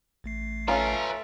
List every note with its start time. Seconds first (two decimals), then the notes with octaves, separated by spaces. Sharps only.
0.24 A1 A3 C7
0.68 C#4 F4 A4 B4 E5 A#5